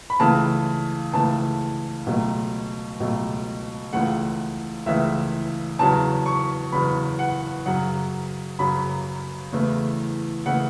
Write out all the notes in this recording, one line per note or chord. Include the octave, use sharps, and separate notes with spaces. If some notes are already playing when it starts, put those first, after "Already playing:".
B5
C#2 C#3 E3 A3 A5
C#2 C#3 E3 A3 A5
C#2 B2 F#3 A3
C#2 B2 F#3 A3
C#2 C#3 E3 A3 F#5
C#2 C#3 E3 A3 E5
E2 C#3 F#3 A5
C#6
E2 C#3 F#3 B5
F#5
F#2 C#3 F#3 F#5
F#2 C#3 F#3 B5
E2 C#3 E3 A3
C#3 E3 A3 F#5